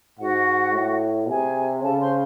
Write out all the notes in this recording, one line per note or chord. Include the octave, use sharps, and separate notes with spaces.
G#2 F#4 F#5
A2
C3 G#4 G#5
C#3 A4 A5
C5 C6